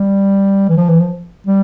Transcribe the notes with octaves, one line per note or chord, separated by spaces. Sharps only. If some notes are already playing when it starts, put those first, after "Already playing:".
Already playing: G3
E3
F3
E3
F3
G3